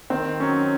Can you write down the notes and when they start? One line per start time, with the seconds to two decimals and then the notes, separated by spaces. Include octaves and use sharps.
0.10 D#3 C4
0.40 F#3 C#4